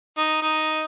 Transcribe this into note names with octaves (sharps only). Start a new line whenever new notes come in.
D#4
D#4